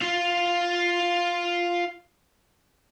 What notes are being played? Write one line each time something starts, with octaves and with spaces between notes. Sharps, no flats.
F4 F5